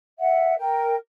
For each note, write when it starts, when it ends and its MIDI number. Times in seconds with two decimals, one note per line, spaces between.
0.19 0.54 76
0.19 0.54 78
0.58 0.95 70
0.58 0.95 79